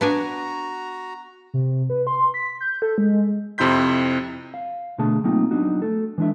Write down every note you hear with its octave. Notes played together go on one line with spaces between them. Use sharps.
B3 D4 F#4 G#5 A#5
C3
B4
C6
B6
G6
A4
G#3
F2 C3 E4 C6 G6 B6
F5
B2 D3 A3 G#4 A5
F#3 A3 A#3 C4 D#4 F4
F#3 B3 D4 D#4 F#4
A3 A4
E3 G#3 D4 E4 E5